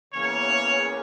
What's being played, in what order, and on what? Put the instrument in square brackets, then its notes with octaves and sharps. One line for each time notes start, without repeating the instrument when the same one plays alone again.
[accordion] E2 C#3 E3 A#3 C#4 [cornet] C#5